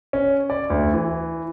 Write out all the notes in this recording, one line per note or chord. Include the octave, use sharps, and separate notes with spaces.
C#4
D5
D2
E3